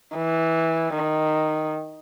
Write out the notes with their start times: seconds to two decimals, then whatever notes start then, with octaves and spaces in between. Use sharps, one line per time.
0.15 E3
0.94 D#3